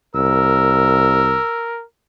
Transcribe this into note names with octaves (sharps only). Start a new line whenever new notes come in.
C2 A#4 E6